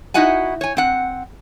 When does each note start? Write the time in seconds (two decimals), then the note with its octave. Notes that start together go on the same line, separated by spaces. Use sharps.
0.14 D#4 E4 F#4 D#5 F#5 G#5
0.61 C#5 G#5
0.77 C4 F#5